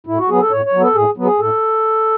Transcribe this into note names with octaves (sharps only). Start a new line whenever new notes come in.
A2 E4
F#4
F#3 B3 G#4
A4
A2 C#5
C#5
F#3
B3 A4
A2 G#4
F#3 B3
G#4
A2 A4